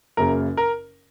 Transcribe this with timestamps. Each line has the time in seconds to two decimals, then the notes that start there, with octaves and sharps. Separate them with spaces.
0.17 F#1 F#2 C#3 A#3 A#4
0.57 A#4